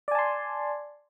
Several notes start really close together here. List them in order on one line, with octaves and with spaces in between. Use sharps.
D5 G#5 A5 C6